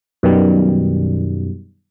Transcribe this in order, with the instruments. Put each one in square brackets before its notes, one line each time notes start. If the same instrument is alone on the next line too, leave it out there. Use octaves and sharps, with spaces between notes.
[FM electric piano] F#2 B2 D#3 G3